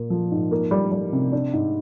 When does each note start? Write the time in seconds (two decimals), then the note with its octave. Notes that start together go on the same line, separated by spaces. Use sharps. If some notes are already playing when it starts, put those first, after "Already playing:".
Already playing: A#2 A#3
0.10 F3
0.31 G#2
0.51 A#3
0.71 G3
0.92 G3
1.13 C3
1.32 D4
1.53 G#2